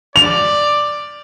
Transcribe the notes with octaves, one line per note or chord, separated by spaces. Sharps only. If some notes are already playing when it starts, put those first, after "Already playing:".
D5 F7